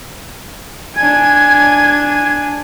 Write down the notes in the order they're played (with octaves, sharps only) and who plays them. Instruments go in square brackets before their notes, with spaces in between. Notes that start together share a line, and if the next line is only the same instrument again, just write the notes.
[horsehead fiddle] D4 G#5 [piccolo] G#6